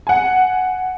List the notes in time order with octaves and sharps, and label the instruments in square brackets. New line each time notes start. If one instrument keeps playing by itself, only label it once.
[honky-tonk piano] F#5 G#5